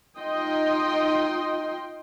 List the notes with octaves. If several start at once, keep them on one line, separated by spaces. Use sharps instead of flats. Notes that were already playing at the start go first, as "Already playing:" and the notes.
D#4 F4 D#5 G5 C6